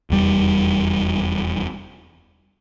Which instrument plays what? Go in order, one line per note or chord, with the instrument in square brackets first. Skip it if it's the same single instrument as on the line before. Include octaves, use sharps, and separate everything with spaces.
[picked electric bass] F1 E2 G3